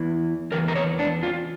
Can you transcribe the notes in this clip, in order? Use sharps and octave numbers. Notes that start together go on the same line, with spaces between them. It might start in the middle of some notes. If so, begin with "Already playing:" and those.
Already playing: E2 E3
E2 E3 A#4
A#4
C#5
D4
F4